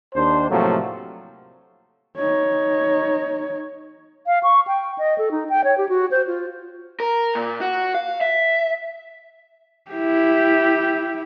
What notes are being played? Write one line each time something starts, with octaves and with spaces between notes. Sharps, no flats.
D#2 D4 C5
A2 C3 F3 F#3 A3 A#3
D#4 C#5
F5
C#6
G5
D#5
A4
D#4
G5
C#5
G4
F#4
C5
F4
A#4
A#2
F#4
F5
E5
E4 G4